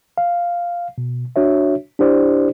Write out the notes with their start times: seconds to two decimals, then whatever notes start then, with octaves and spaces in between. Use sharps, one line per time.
0.18 F5
0.98 B2
1.36 D4 F#4 C#5 E5
1.99 D4 E4 G4 C5 D5